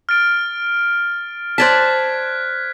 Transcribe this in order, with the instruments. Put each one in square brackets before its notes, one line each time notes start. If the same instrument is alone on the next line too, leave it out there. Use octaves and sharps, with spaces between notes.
[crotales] F6 A6 D7
[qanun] C5 D5 A5 [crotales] F#6 G#6 B6